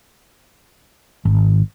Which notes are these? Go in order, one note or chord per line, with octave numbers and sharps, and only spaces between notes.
G#1